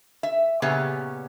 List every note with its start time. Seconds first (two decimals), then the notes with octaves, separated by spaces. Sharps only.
0.23 E5
0.62 A#2 C#3 B3 C#4 G4